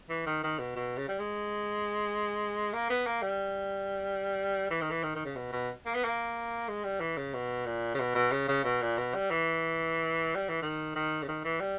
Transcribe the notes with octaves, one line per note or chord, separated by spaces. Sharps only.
E3
D#3
D#3
B2
B2
C#3
G3
G#3
A#3
B3
A#3
G3
E3
D#3
E3
D#3
D#3
C#3
B2
B2
A#3
B3
A#3
G#3
G3
E3
C#3
B2
A#2
C#3
B2
B2
C#3
C#3
B2
A#2
B2
G3
E3
G3
E3
D#3
D#3
C#3
D#3
E3
G3